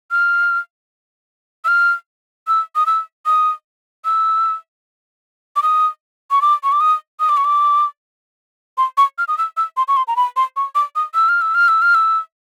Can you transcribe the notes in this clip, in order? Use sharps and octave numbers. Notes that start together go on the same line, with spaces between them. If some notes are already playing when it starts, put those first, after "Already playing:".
F6
E6
F6
E6
D#6
E6
D#6
E6
D6
D#6
C#6
D6
C#6
D6
D#6
D#6
D6
C#6
D6
C6
C#6
F6
D#6
E6
E6
C6
C#6
C6
A#5
B5
C6
C#6
D6
D#6
E6
F6
E6
F6
E6
F6
E6